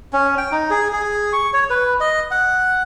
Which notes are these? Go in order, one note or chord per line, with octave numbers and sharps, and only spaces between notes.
C#4
G5
D#4
G#4
G#4
C#6
C#5
B4
D#5
F#5